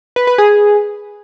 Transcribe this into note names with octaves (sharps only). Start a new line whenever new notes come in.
B4
B4
G#4